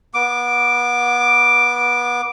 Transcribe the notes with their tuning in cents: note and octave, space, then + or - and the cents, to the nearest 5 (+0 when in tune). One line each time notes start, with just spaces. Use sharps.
B3 -25 D6 +0